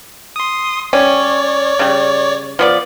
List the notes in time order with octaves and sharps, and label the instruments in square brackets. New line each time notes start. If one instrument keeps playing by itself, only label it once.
[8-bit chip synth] C6 D#6
[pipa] G3 C#4 [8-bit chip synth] C#5 D5
[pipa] C#3 G3
F3 B3 D5